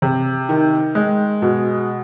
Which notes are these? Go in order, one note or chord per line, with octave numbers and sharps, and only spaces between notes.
C3
D#3
G#3
B2